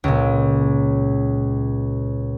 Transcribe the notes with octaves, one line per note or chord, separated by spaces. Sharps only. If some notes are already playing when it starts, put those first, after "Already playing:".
C#2 A#2